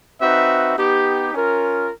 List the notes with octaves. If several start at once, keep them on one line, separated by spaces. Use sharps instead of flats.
C4 D#4 F#4 B4 E5
B3 D#4 G4
C#4 F4 A#4